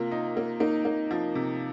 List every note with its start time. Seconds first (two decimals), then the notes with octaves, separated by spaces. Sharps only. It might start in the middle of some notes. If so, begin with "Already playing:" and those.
Already playing: C3 A#3 F4
0.11 D#4
0.37 A#3
0.60 A#3 D#4
0.85 A#3
1.11 F3
1.35 C3